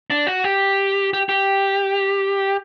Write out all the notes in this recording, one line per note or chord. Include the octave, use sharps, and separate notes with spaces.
D4
F#4
G4
G4
G4